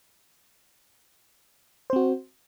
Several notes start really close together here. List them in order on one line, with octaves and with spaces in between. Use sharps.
C5 C4 F#4